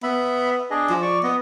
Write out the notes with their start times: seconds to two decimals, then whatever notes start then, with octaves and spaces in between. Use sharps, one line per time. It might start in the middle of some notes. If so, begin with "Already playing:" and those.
0.03 B3 E5 B5
0.71 D4 G#4 D#5
0.90 F3
1.02 D5 C#6
1.23 B3 D#5